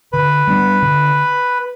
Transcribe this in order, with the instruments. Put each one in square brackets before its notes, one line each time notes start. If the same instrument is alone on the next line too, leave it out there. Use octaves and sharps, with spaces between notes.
[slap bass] D3 [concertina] B4
[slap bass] G3 B3 D4
D3